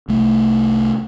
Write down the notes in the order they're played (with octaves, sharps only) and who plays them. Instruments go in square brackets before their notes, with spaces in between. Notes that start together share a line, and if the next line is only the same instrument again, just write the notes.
[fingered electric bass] C2 A3